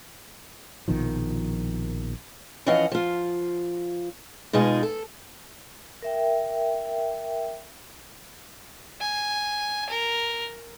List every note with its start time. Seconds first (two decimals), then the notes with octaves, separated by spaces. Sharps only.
0.88 A#1 B2 D#3 F3
2.66 E3 F3 C#4 D#5 F5 F#5
2.92 F3 F4
4.53 B2 G#3 D#4 F4 G#4
4.83 A4
6.02 A#4 E5 G5
9.01 G#5
9.90 A#4